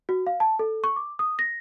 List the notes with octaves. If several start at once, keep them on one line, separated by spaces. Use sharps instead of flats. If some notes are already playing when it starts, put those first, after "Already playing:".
F#4
F5
A5
A4
C#6
D6
D#6
A#6